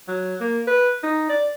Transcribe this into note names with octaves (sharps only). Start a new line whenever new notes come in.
F#3
A#3
B4
D#4
D5